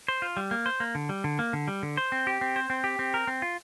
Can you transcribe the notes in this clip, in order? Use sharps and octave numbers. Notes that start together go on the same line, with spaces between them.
C5
F4
G3
A#3
C5
A#3
D3
G3
D3
A#3
D3
G3
D3
C5
C4
G4
C4
C5
C4
G4
C4
A#4
C4
F4